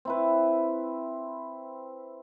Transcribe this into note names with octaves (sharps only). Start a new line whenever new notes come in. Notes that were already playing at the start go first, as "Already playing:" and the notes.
C4 E4 B4